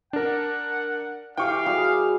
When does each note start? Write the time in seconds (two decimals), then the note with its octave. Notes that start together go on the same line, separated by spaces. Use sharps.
0.13 D4 A#4 F#5
1.37 E3 G4 F5 G5 C#6 D6
1.66 G3 F#4 G#4